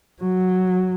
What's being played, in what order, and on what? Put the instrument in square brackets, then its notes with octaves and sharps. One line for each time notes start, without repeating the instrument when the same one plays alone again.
[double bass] F#3